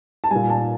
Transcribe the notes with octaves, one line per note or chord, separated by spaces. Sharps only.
A5
A#2 G3 G#5
A5